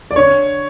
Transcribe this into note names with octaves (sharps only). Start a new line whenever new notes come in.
D5
D3 C#5